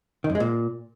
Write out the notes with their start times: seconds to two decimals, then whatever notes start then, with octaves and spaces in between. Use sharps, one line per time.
0.24 D#3
0.30 F#2
0.35 G#3
0.40 A#2